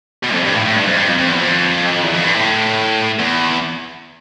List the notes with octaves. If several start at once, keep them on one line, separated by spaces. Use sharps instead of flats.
B2
F2
G2
A2
A2
G2
F2
G2
F2
F2
E2
F2
E2
F2
G2
A2
E2